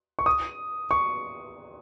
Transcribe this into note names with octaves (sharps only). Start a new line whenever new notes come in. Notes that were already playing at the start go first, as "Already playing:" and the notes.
C#6
D#6
C#6